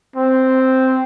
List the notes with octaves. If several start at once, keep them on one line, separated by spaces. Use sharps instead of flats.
C4